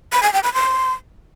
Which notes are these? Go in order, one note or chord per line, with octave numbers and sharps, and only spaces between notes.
B5
G#5
G5
B5
C6